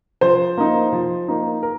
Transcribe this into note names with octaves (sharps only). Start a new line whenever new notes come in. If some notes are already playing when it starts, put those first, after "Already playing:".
F3 C5
A#3 D#4
F3
A#3 D#4
A#4